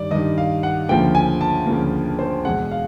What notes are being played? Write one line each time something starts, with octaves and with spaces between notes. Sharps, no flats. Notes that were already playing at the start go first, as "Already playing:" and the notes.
Already playing: G2 D#3 G3 D5
G2 D#3 G3 D#5
F5
F#5
D2 C#3 F3 A#3 G5
G#5
A5
D2 C#3 F3 A#3
C5
E2 B2 G#3 F#5
F5